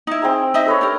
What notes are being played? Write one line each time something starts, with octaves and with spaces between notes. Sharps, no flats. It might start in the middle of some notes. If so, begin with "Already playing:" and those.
D#4 E4
C4 G#4 A#5
D#4 D#5 E5
A4 B4 C#5
D4 G4 A#4